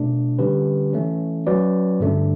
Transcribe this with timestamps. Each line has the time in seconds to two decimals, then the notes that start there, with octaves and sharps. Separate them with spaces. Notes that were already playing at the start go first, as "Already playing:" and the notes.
Already playing: B2 A3 D4
0.39 D3 G3 C#4 G4 B4
0.93 E3 A3 C#4
1.47 F#3 C#4 F#4 B4 D5
2.00 G2 D3 A3 D4